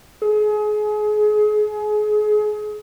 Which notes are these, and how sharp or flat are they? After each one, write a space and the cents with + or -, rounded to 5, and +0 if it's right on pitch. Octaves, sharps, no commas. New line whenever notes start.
G#4 +30